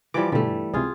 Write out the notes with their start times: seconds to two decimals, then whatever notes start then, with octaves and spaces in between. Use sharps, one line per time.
0.14 E3 F3 G3 D6
0.32 G2 B2 D3 G3 A3
0.74 C#2 C3 F4 G#4